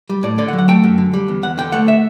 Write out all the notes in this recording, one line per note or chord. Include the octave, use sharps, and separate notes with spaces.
G3
A2 D5
D3 D5
F#5
F#3
F#5
A3 G5
F#2
D3
G3
E2
E2 F#5
D3 G5
A3 F#5
E5